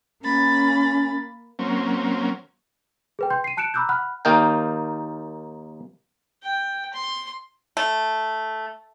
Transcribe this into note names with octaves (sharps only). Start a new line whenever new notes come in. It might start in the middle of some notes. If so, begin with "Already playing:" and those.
A#3 C#4 B5 A6
F#3 A#3 C4 C#4
G#4 B4 G5
G5 C6 G6
C7 D#7
A5 F#6 C#7 D7 E7
A#5 B5 D6 E6 F#6 G6
F#5 B5 F6 F#6
D#2 A#3 D#4 A#4 G5
G5
C6
A3